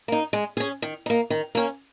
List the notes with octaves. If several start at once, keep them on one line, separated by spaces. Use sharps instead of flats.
A#3 D#4
G#3
C#4 G#4
D#3
A#3 D#4
D#3
A#3 C#4